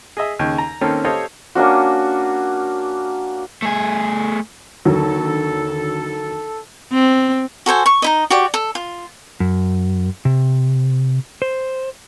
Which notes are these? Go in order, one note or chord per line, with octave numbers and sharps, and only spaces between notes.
G#4 D#5 E5
D#2 C#3
A#5
D#3 A#3 C4 C#4 A4
G4 A4 C5 C#5 D#5 F5
A#3 C#4 D4 F#4
A3 G#4
D#2 D3 F#3 A4
C4
F#4 A4 C5 G#5
C#6
D#4 E4 D#5
F#4 G4 D5
A4
F4
F#2
C3
C5